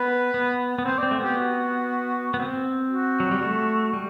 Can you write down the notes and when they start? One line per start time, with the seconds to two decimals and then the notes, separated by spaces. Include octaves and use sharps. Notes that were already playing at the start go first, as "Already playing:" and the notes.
Already playing: B3 B4
0.34 B3
0.79 B3
0.86 C4 C5
0.98 D5
1.03 C4
1.11 A3
1.20 B3 G4
1.37 F#4
2.34 B3
2.40 C4
2.91 F#4
3.20 F#3
3.31 G3
3.43 A3
3.93 G3